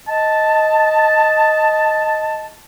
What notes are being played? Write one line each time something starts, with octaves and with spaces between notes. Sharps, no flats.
D#5 A5